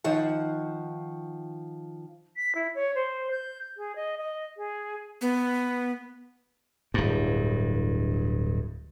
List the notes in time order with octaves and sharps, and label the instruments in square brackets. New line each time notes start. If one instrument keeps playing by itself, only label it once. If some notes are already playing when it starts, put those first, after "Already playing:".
[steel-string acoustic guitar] D#3 F3 F#5
[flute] B6
E4
C#5
C5
G6
G#4
D#5
D#5
G#4
[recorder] B3
[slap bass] D1 G2